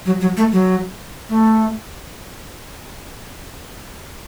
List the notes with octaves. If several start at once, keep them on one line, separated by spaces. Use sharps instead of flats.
F#3
F#3
A3
F#3
A3